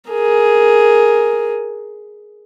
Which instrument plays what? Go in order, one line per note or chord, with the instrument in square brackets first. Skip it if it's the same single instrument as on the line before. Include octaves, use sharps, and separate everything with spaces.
[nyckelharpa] G#4 A#4